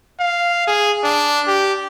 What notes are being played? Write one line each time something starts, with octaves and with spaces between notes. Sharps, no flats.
F5
G#4
D4
G4